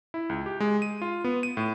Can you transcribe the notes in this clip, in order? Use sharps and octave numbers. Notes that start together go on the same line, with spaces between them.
E4
C#2
G4
G#3
D#7
F4
B3
D#7
A2